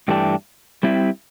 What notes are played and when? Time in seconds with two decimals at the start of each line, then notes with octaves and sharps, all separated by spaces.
0.08 G2 E3 A3 D4 G4
0.83 G3 C4 E4